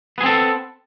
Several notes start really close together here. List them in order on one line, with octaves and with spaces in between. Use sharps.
B3 G#4 C4 A4